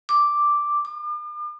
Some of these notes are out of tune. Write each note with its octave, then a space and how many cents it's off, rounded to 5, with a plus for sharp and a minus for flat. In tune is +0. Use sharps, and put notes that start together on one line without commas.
D6 +0
D6 +45